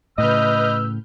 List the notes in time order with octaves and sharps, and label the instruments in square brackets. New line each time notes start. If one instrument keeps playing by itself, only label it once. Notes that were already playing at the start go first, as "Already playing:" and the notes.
[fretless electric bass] A2 C#3 [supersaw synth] B4 F6 G6 [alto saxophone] D#5 [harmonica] E6